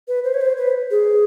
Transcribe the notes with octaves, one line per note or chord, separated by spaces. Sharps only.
B4
C5
C#5
C5
B4
G#4